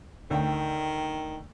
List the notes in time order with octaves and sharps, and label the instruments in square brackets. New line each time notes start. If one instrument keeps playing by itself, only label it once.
[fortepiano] D2 G5 [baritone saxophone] D#3